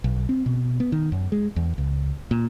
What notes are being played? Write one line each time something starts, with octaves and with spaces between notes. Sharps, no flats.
B1
C4
B2
B3
D#3
F#2
G#3
E2
C#2
A#2